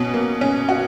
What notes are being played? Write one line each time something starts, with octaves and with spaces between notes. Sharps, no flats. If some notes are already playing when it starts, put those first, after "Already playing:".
Already playing: B2 C#4 F#4
A#3
C#4
F#4